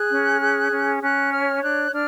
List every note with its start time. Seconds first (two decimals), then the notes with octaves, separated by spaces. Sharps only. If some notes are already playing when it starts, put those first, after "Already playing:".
Already playing: G#4 F#6
0.11 C#4
0.41 G#4
0.71 C#4
1.01 C#4 F#6
1.31 C#5 F6
1.62 D4 F#6
1.92 D4 F6